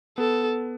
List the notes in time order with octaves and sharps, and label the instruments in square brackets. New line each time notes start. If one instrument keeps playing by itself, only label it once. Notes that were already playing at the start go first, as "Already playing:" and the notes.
[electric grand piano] B3 [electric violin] A4